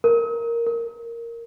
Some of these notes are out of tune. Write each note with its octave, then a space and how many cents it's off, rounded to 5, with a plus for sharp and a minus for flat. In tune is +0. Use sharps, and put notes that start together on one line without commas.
A#4 +0
A#4 -5